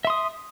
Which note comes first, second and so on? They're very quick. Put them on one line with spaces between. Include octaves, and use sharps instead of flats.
E5 C6 D#6